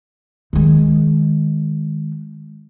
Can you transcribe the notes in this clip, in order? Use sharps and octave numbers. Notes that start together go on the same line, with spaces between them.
D#3 G#3